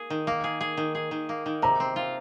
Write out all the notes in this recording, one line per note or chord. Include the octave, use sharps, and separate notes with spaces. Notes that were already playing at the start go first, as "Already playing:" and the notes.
Already playing: A#3 G#4
D#3
A#3
G#4
G#4
D#3
G#4
D#3
A#3
D#3
C3 A#5
C4
F4